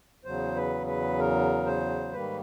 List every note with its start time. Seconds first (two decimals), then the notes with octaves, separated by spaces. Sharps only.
0.25 E2 C#3 F#3 C5
0.56 B4
0.87 B4
1.19 A#4
1.66 C5
2.13 G#2 D#3 G3 A#3 B4